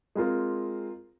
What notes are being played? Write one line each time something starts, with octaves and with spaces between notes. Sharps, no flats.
G#3 C4 F4 A#4